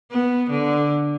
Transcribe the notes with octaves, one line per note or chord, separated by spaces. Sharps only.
B3
D3